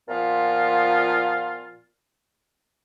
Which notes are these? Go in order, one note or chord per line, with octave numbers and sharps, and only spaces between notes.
A#2 F3 B3 F4